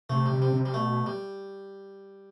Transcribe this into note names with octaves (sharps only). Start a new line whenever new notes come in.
C3 A3
G3
C3
G3
C3
G3
B2 A3
G3